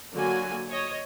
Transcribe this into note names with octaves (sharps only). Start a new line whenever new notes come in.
D3 F#3 A#3 F#4 G#5
C#5 D#5